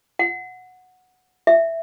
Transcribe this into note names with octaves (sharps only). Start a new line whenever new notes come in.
F#5
E5